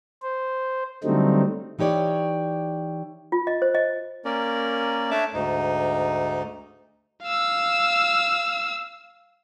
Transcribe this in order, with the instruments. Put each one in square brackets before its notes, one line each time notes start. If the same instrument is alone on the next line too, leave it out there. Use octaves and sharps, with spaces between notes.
[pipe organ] C5
D3 F#3 G3 A3 C4 D#4
[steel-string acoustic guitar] E3 D#4 G4 C#5 D5
[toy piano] F4
D#5
C5
D#5
[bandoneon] A#3 C#4 A#4 D5
A3 D4 C#5 E5 A5 D6
D2 G#2 D#4
[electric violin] F5 E6